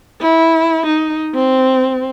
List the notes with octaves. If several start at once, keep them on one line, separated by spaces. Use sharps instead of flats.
E4
D#4
C4